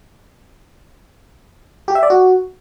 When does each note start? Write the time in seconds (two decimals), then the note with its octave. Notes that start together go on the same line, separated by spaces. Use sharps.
1.88 G4
1.95 E5
2.03 D5
2.10 F#4